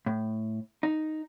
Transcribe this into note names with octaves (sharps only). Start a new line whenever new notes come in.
A2
D#4